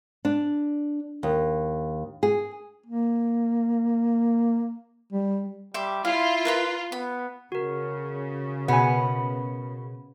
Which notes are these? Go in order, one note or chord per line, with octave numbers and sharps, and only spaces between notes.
D4
D#2
G#4
A#3
G3
G3 E5 C6 D6
E4 F4 F5
A#4 B4 B5
B3 B5
C#3 F#4 A#4
B2 B3 G#5